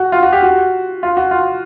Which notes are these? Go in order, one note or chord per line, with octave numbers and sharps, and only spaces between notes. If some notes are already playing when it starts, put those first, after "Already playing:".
Already playing: F#4
F4
F#4
G4
F#4
F4
F#4
F4